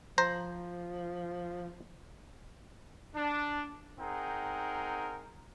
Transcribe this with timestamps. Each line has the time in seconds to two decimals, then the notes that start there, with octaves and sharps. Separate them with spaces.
0.18 F3 C5 A#5
3.15 D4
3.99 C4 D#4 G#4 A#4 F#5 G5